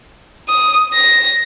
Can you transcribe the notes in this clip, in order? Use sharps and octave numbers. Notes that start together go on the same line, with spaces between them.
D#6
A#6